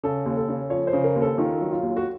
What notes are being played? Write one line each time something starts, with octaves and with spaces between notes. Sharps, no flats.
C#3 A4
D#2
A4
C#3
F3 C#5
C5
C#3
A#4
D#2
A4
D#3 F4
F#3
F4
D#2
F#4